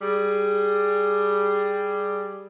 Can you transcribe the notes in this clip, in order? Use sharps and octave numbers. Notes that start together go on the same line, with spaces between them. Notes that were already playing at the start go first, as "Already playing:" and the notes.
G3 G#4